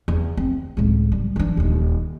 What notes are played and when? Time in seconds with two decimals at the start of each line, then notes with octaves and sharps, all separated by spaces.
0.08 E2
0.37 C4
0.77 C#2 A2
1.12 G3
1.36 E3 D4
1.57 D#1 D#2